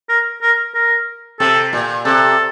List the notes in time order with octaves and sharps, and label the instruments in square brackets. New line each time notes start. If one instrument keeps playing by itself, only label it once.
[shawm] A#4
A#4
A#4
[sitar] C3 [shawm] A4
[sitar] A#2
[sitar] C3 [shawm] A4